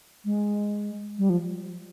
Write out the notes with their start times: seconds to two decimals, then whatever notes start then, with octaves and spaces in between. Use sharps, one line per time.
0.25 G#3
1.19 G3
1.30 F3